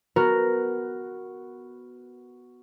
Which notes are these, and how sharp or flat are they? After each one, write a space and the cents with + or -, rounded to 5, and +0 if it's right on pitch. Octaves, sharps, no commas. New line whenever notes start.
B3 +0 F#4 +0 A#4 +0